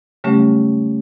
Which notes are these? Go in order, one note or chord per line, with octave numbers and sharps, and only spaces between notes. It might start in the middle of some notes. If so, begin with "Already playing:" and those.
C#3 F#3 G3 A3 C#4 G4